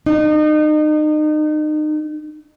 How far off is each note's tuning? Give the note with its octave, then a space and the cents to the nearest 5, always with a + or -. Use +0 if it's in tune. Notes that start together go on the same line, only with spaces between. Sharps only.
D#4 -35